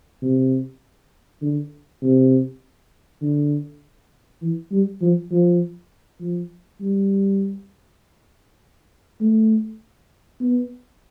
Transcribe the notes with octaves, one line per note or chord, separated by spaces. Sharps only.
C3
D3
C3
D3
E3
G3
F3
F3
F3
G3
A3
B3